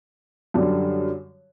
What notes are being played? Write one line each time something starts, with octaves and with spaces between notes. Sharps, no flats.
F#2 D3 G3